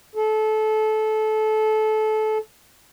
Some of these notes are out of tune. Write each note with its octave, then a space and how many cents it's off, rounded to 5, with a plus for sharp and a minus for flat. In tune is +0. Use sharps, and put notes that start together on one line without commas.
A4 -25